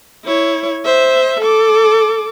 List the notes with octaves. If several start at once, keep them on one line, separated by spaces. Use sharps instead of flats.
E4 C#5
C5 E5
A4 D6